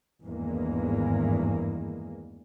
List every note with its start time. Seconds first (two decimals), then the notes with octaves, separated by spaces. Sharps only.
0.25 G#1 E2 G2 E3 G#3 A#3